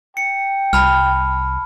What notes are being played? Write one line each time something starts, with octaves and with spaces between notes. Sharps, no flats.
G5 C#7
C2 A5 B5 F6